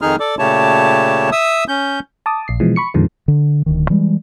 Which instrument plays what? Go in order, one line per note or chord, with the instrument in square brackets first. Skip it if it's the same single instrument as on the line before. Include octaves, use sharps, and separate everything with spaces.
[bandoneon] F2 D#3 D#4 G#4 F6
A4 D5 D6
A#2 C#3 A3 G4 C#5 A5
E5 D#6 E6
C#4 G6
[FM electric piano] A5 D6 D#6
A#1 C7
B2 E3 F3 G#3
B5 C#6 C#7
F2 A#2 D3 D#3 F3 G#3
[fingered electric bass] D3
D1 D2 D#3
E3 G3 G#3